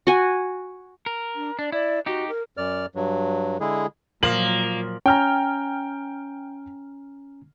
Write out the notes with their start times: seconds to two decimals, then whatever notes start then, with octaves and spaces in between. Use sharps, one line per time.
0.07 F#4 G#5
1.06 A#4
1.36 D4
1.59 D4 D5
1.72 E4 D5
2.06 D#4 F#4 G4
2.29 A#4
2.57 F#2 D5 F6
2.95 G2 F#3
3.60 D3 G#3 E4 G#4
4.23 A#2 F3 F#3 A#3 F#7
5.06 C#4 G5 G#5 A#5 F6